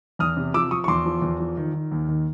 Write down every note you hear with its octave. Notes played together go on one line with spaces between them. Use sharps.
E2 D#6 F6
C3
F3 D6 E6
F3 C#6 D#6
C#6
E2 C6 D6
F3
E2
F3
D#3
D#3
D#2
D#3